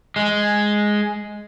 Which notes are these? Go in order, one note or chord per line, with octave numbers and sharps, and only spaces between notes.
G#3